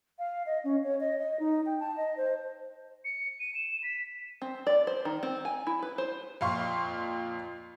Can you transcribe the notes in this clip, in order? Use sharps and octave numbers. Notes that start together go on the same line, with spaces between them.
F5
D#5
C#4
C#5
D#5
D#5
D#4
G5
A5
D#5
C5
C#7
D#7
E7
B6
C4
D5
C5
D#3
C4
G#5
E4
B4
C5
F2 A#2 F5 C6 C#6